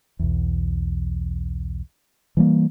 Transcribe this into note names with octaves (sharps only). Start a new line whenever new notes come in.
B1 E2
E3 G3 A#3